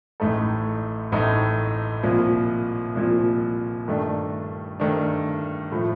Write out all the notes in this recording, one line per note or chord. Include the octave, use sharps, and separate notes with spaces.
A1 A2 A3 D#4 A4
A1 A2 A3 D#4 A4
C2 A#2 F3
C2 A#2 F3
G2 D#3 A3 D4
G2 D#3 A3 D4
A2 F3 A3